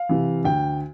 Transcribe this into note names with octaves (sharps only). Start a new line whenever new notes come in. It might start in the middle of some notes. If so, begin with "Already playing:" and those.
Already playing: F5
C3 E3
D2 G5